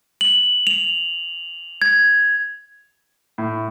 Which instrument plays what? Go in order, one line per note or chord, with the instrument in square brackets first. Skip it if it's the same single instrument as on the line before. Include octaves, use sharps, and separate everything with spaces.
[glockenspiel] F#7
F7
G#6
[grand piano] A2